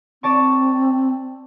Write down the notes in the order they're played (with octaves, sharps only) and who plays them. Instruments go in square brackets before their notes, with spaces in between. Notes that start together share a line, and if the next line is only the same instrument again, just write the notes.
[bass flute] C4 [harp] D5 A5 C#6